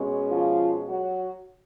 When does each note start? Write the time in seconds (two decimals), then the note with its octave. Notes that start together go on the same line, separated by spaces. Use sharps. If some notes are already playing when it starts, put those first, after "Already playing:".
Already playing: B2 G#3 C#4
0.30 F3 F4
0.88 F#3 F#4